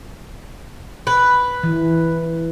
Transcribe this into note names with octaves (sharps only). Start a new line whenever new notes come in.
B4
E3